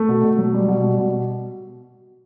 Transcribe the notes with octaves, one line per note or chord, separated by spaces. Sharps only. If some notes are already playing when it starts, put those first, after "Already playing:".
Already playing: A3
B2
B2
F#3
G3
B2
G3
B2